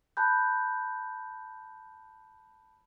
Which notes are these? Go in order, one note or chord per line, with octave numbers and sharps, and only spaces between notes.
A5 B5 F#6 G6